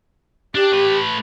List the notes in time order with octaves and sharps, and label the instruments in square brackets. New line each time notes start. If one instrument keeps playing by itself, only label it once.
[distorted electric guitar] D4 [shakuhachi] G4
[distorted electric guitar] A3 B4